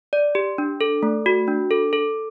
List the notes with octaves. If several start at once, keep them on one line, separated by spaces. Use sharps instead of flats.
D5
G4
D4
A4
A3
F#4
D4
A4
A4